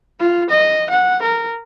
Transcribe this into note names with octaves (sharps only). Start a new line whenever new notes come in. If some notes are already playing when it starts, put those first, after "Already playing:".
F4
D#5
F#5
A#4